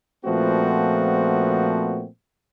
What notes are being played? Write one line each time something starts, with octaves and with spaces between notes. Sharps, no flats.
A#2 F3 A3 B3 C4 F#4